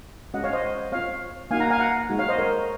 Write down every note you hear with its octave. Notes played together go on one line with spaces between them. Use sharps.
G#3 C#4 F#4 D#5 F#5
C#5 F5
C5 D#5
C4 F4 C#5 F5
A#3 D#4 F#4 F5 G#5
F#5 A#5
F5 G#5
F#5 A#5
G#3 D#4 F#4
C#5 F5
C5 D#5
A#4 C#5